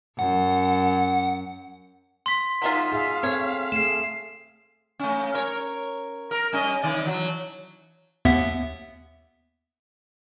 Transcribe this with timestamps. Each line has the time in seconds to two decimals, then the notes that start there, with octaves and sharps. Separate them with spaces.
0.19 F#2 F#5
2.26 C6 B6
2.62 F#3 G#3 D#4 F4 E5
2.92 G#4 E5 F5
3.23 C4 A4 C#5
3.72 A3 G#4 C7 E7
4.99 A3 C#4
5.34 A#4 C#5
6.31 A#4
6.53 G3 C#4 D#5
6.83 C3 D#3 D5
7.06 E3 F#3
8.25 D#2 B3 E5